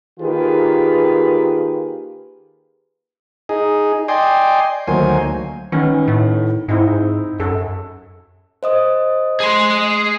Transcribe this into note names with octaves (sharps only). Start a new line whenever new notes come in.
D#3 A#3 F4 G4 G#4 B4
D#4 G#4
D5 D#5 G5 G#5 C6
D2 D#3 F#3 A#3 C5 G#5
D#3 B3 C#4
A2
G#2 C4 D#4 E4
F#2 A4
C5 D#5 D#6
G#4 C6